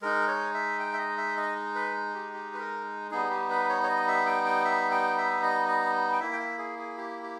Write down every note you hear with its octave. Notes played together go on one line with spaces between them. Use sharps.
G#3 D#4 A#4
C#5
E5
G5
E5
D#5
E5
D#5
B4
G4
G4
B4
A#4
G3 B3 D#4 G#4
G4
B4
C#5
C#5
D#5
E5
G5
G5
E5
G5
E5
D#5
D#5
G5
A#3 E4 E5
G5
E5
G#4
G#4
G4
G4